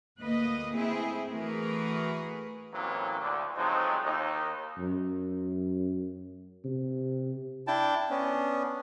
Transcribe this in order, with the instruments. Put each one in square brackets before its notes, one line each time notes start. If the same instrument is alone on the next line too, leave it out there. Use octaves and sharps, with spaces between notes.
[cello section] D2 A#3 B4 D#5
A3 C4 E4 G#4
E3 A3 F#4 G#4 A#4 B4
[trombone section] A1 A2 E3 F#3 A#3 C4
D2 D3
F3 F#3 G#3 A3 C4 D#4
D#2 D#4
[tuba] F#2
C3
[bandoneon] D4 E4 G5 A5
B3 C#4 D4